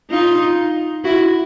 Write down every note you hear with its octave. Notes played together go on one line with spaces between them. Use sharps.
D#4 F4
E4 F#4